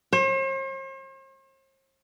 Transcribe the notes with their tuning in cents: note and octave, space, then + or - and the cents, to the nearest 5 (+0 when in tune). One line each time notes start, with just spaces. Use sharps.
C5 +45